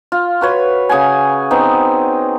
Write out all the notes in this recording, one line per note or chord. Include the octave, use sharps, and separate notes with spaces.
F4
F#4 B4 C#5
C#3 G#4 F#5 G#5
B3 C4 D#4